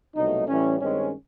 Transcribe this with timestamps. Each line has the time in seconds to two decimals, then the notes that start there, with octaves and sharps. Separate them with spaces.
0.16 C2 B2 F#3 A3 D#4
0.48 A2 E3 G3 C#4
0.80 G2 D#3 G#3 C4 C#4